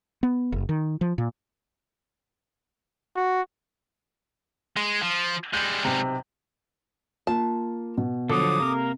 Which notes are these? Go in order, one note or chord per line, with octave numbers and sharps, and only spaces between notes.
B3
F#1
D#3
F3
A#2
F#4
G#3
F3
G3 G#3 G6 F#7
B1 C3
A#3 F4 A5
B2
D3 F3 F#3 A4 D6 D#6
C3 A#3 A#4